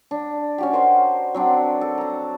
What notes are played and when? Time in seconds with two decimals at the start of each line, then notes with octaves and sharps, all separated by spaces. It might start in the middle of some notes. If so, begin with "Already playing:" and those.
0.11 D4
0.58 C#4 F#4 G4
0.73 A#4 C5 F#5 C6
1.34 F#3 C4 D4
1.81 A4
1.98 A5 A#5